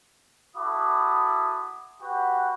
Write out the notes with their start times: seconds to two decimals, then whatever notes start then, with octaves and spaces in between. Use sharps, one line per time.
0.56 E4 F#4 A4 B5 D6 D#6
2.02 F#4 G4 B4 F#5